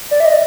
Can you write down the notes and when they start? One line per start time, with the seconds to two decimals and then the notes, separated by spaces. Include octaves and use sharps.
0.11 D5
0.20 E5
0.26 D#5